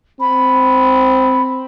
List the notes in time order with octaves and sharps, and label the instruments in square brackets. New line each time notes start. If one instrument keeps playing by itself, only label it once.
[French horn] C4 [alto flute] B5